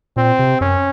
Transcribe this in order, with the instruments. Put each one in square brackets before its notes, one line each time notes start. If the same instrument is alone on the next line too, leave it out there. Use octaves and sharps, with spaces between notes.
[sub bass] A#2 [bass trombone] C4
[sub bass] C3
[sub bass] F#2 [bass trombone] C#4